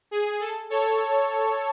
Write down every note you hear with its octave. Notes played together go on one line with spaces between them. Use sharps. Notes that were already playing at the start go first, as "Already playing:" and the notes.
G#4
A4
A4 C#5